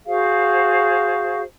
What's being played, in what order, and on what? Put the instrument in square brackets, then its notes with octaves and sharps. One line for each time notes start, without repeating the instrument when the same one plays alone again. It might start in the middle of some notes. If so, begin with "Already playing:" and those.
[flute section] F#4 G#4 C5 F5